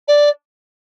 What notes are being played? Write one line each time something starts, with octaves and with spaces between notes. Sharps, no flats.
D5